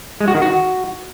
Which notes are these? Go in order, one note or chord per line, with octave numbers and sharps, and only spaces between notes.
G#3
F#4
D#3
F#4